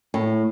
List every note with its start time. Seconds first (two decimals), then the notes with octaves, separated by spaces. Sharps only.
0.14 A2